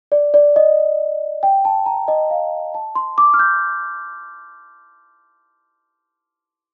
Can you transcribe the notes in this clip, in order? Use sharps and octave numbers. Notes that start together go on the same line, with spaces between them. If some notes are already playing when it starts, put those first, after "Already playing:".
D5
D5
D#5
G5
A5
A#5
D#5
F5
A5
C6
D6
F6
G6